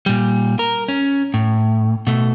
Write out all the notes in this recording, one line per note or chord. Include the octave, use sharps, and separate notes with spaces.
A#2 G3
A#4
C#4
A2
B2 A3